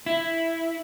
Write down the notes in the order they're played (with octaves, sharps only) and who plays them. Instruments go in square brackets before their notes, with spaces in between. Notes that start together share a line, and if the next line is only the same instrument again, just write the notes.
[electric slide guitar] E4